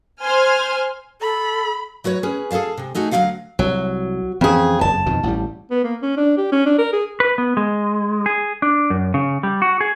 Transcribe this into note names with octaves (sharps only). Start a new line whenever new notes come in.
C5 G#5 C6 F6
A4 B5
F#3 F#4 B4 C#5
C#4 G#4 B4
G#4 A4 C#5 F5 A5
C3 G#3
A3 D#4 F#4 G#4 F#5
D2 F#3 A3 B3 F5 F#5
C2 F#3
F2 E3 C4 C#4 G#4
F#1 F2 A5
F2 B2 D#3
A1 A2 G3
B3
A#3
C#4
D4
G4
C#4
D4
A#4
G#4
B4
B3
G#3
G#4
D4
F#2
C#3
G3
F#4
G#4